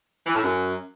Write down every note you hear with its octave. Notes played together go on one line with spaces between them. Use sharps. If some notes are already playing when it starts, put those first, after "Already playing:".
E3
A2
F#2